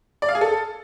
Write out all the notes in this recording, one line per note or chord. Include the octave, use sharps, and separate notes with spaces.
D5
F5
G#4
A4